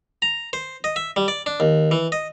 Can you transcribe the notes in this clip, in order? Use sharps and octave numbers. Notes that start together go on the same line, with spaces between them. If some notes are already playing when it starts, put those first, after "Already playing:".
A#5
C5
D#5
E5
G3
D5
D4
D#2
E3
D#5